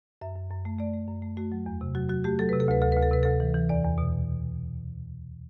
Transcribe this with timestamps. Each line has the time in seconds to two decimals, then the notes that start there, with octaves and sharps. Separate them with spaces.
0.21 F#2 E5
0.36 F#2
0.50 F#2
0.65 A3
0.79 A3 D5
0.94 A3
1.08 F#2
1.22 A3
1.37 A3 F#4
1.52 F#3
1.66 E2
1.81 C3
1.95 F#3 F#4
2.09 F#3 F#4
2.24 A3 G4
2.39 F#3 A4
2.49 C3 B4
2.60 A4
2.68 D2 B4
2.82 D2 A4
2.92 D2 B4
3.02 A4
3.11 C3 B4
3.23 D2 A4
3.40 E3
3.54 E3
3.69 E2 D5
3.84 E2
3.98 B2